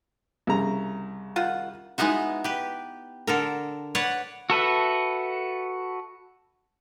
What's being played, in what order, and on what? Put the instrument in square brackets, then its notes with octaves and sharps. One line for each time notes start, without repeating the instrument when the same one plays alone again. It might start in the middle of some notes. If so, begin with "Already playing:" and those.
[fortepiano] C2 C#3 A#5
[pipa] D#3 F4 F#5
[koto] G#3 B3 D#4 E4 F#4
G4 B4
D3 A4 A#4
B4 C#5 D5 F#5
[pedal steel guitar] F#4 A4 B4 E5